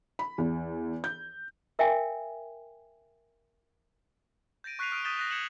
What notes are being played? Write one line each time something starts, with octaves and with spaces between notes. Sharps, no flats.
B5
E2
G6
A#4 E5 F5 G5 G#5
G6 A6 A#6 D7 D#7
C#6 F#6 B6 C7 D#7 F7
D#6 F6 F#6 D7 F7
D#6 G6 A6 B6 E7 G7
F#6 A#6
G6 G#6 C#7 E7 F#7